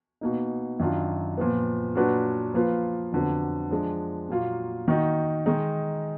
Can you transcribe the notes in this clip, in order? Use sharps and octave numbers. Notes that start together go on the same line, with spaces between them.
B2 A#3 D#4
F#2 D#3 F#3 D4 F4
A#2 F3 B3
A#2 F#3 D4 F#4 B4
F3 A#3 F4 B4
F2 D3 F#3 B3
F3 G#3 D4
A#2 F#3 A#3 F4
D#3 A#3 D#4 F#4
D#3 G#3 D#4